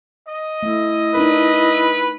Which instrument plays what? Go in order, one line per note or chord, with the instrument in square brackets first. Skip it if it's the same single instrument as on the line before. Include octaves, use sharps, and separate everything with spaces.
[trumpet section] D#5
[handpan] A3 [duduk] E4
[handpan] D4 D#4 A#4 [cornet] B4